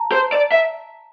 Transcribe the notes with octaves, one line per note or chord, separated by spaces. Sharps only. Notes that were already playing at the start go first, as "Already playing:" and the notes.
Already playing: A5 A#5
C5
D5
E5